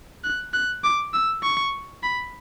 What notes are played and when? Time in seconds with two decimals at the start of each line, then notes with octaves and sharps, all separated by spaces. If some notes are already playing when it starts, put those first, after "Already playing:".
0.24 F#6
0.53 F#6
0.84 D6
1.13 E6
1.43 C#6
2.03 B5